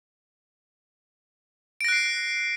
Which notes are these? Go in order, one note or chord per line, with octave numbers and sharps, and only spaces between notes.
F#6 A#6 C7 D7